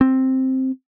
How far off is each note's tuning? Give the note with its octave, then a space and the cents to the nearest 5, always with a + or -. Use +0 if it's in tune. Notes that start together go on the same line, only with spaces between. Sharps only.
C4 +5